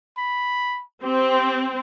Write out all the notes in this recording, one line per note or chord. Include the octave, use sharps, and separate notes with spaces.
B5
C4 G4